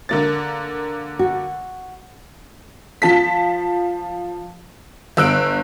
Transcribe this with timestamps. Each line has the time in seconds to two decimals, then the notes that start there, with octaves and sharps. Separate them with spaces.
0.09 D3 A#3 A6
1.19 F#4
3.02 F3 A5 B6
5.17 G1 E6 F#6 D7